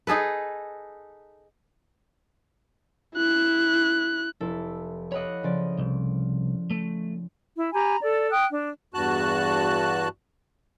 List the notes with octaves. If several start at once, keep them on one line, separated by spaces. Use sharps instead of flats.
D#4 G#4 A4 B4
E4 F#6
F1 E4 A4
C#5 D#5 F5 F#5 B5
C#3 F3 D5
C2
A3
E4
G4 G#5 A#5 B5
A4 D5
G5 D#6 F#6
D4
E2 G2 F#4 A5 F#6